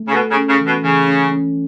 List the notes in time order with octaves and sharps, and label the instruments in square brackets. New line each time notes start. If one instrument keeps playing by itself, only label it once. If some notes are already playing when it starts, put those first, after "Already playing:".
Already playing: [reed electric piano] A3
[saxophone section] C#3
[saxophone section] B2 [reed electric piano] A4
[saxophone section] C#3
[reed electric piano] C#4
[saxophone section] C#3
[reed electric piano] E3
[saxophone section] B2
[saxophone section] C#3 [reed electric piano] E3
[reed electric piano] C#4
C#4